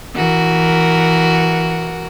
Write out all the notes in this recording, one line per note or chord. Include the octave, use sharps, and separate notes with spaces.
E3 F#4 A#4